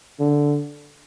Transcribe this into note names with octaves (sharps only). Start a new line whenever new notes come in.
D3